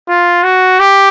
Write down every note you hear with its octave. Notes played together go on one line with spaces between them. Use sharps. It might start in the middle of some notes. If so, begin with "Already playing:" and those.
F4
F#4
G4